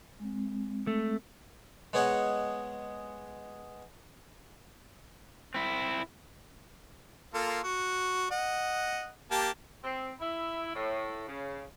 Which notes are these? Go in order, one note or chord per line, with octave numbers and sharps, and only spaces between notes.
G#3 C4
A3
G#3 B3 G#4 C#5 D#5 F#5
C4 E4
A#3 F4 A4
F#4
D#5 F#5
A#3 G4 A5
C4
E4
A2
C#3